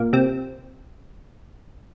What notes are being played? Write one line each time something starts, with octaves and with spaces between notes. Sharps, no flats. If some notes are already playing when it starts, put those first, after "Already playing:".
Already playing: A#2 A#3
C3 C4